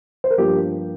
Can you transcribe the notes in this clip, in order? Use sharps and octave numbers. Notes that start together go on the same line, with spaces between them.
C5
A#4
G2 F3 A#3 G4